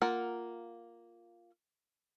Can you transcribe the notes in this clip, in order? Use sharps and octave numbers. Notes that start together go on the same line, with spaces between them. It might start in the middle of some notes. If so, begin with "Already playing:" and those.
A#3 F4 A#4 F#5